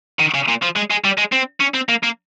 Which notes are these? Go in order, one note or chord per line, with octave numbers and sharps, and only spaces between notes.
D#3
C#3
A#2
F3
G#3
G#3
G3
G#3
C4
C#4
C4
A#3
A#3